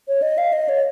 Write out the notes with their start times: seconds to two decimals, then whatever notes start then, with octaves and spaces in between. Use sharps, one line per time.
0.08 C#5
0.22 D#5
0.38 F5
0.53 D#5
0.69 C#5